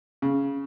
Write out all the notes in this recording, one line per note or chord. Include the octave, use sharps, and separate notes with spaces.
C#3